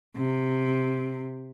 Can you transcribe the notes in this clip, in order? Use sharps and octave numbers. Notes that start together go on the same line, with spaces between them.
C3